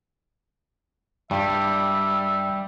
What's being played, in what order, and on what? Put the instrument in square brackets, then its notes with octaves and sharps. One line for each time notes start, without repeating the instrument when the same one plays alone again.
[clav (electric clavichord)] G2 [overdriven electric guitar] G3 [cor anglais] E5